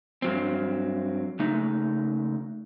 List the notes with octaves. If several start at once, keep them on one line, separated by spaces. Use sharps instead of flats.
G2 F#3 C4
C#3 A3 D#4